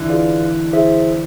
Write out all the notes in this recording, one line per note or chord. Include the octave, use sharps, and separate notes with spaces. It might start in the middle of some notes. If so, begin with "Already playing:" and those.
Already playing: D3 E3
F4 G#4 B4 D5 F5
E4 G#4 C5 E5